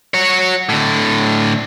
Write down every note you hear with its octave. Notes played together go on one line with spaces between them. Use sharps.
F#4 C#5
A2 D3